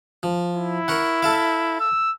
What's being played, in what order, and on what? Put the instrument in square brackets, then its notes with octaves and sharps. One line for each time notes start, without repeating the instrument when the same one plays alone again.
[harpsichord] F3
[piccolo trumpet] E4
[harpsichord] A#4 C#5 F#5
A4 E5 F5
[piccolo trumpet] E6